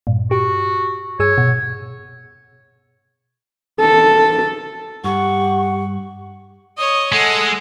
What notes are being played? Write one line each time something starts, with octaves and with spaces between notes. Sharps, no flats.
G2 A#2
F#4 G4
G2 G#4 C#5 E6
B2
A4
G2 G4 F#5 C#6
C#5 D#5 D#6
G#3 A4 F#5